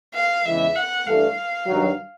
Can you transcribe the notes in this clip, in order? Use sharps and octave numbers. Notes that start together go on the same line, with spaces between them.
F5
E2 C#3 E3 G#3 E5
F#5
G2 E3 A3 D4 F5
G2 D#3 F#3